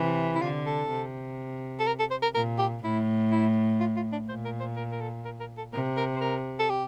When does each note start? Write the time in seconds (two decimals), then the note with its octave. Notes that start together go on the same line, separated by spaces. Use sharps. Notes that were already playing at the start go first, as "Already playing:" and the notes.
Already playing: C3 E3
0.35 E4
0.42 D3 F4
0.66 A4
0.90 C3
1.80 A4
1.87 A#4
1.99 A4
2.11 C5
2.22 A#4
2.34 A#2 A#4
2.59 G4
2.84 A2 E4
3.32 E4
3.80 F4
3.96 F4
4.12 D4
4.28 A#2 C5
4.45 A#4
4.60 C5
4.76 A#4
4.92 A#4
5.01 A4
5.25 A#4
5.40 A#4
5.57 A4
5.73 C3 A#4
5.97 A#4
6.15 C5
6.21 A#4
6.59 A4
6.70 G4